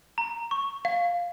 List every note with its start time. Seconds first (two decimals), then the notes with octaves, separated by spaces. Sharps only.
0.18 A#5
0.51 C#6
0.85 F5